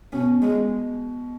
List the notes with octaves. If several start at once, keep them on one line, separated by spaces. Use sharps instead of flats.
B2 C#4
G#3